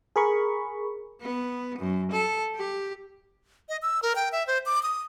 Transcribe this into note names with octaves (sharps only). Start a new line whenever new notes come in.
G#4 A#4 B5 C#6
B3
F#2
A4
G4
D#5
E6
A#4
G5
E5
C5
D6
D#6